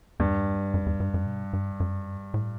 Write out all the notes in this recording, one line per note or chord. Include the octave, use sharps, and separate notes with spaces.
E2 G2
F#2
E2
G2
F#2
B2
G2
F#2
A2